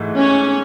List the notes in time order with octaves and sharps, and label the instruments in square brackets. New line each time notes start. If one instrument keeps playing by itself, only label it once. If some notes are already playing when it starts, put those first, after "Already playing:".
Already playing: [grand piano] G#2 E3 A3
[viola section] C#4